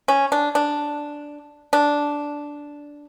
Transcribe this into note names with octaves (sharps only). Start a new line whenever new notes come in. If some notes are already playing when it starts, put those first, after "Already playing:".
C#4
D4
D4
D4